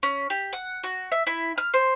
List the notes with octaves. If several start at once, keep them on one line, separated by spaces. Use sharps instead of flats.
C#4
G4
F#5
F#4
E5
E4
F6
C5